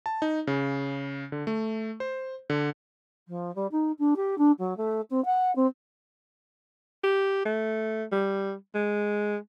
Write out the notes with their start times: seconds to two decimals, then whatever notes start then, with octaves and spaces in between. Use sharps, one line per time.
0.06 A5
0.22 D#4
0.47 C#3
1.32 D3
1.47 A3
2.00 C5
2.50 D3
3.27 F3
3.55 G3
3.71 D#4
3.98 D4
4.16 G4
4.38 D4
4.58 F#3
4.77 A3
5.10 C4
5.25 F#5
5.55 C4
7.03 G4
7.46 A3
8.12 G3
8.75 G#3